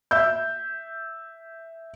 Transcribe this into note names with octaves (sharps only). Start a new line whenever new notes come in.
E5 E6 G6